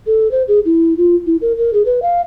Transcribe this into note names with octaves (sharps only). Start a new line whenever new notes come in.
A4
C5
G#4
E4
F4
E4
A#4
A#4
G#4
B4
F5